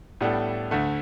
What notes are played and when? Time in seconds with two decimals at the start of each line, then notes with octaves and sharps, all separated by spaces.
0.21 A2 G3 B3 D4 A4
0.71 D2 D3 A3